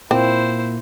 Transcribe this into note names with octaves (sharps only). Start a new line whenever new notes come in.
A#2 A#3 C4 E4 C5